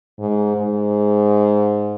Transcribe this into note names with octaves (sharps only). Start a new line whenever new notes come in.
G#2
G#2